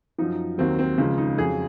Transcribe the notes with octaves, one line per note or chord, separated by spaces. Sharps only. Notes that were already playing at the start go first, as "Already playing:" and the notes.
F#2 F3 D#4
D#2 D#3 F#3 C4
C4
C#2 C#3 F3
D#4
F2 C#3 F#3 G#4